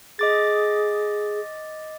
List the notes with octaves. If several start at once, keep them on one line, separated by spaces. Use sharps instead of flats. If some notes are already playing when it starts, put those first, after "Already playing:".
G#4 D#5 D6 A6